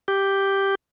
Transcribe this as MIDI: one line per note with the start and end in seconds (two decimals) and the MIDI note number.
0.08 0.75 67